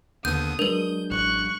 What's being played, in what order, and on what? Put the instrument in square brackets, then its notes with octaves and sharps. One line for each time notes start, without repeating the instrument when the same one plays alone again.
[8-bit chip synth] D#2 D3 B3 [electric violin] D#6 [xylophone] G6
[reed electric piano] F#3 G#3 D4 [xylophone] A#4 B4 [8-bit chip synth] G6
[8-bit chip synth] A1 [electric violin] C#6 F#6